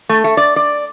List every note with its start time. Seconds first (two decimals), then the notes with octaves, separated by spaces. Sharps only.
0.09 A3
0.24 A3
0.37 D5
0.56 D5